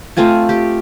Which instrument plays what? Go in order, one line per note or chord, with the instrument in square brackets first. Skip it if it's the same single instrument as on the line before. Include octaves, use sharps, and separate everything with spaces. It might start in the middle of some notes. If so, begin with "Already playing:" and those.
[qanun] A3 C4 F4 G#5
G4